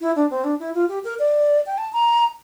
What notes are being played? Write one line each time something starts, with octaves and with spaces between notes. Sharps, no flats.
E4
D4
C4
D4
E4
F4
G4
A#4
D5
G5
A5
A#5